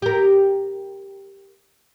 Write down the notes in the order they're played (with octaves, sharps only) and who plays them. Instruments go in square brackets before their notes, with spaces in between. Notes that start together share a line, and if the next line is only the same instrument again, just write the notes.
[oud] G4 A#4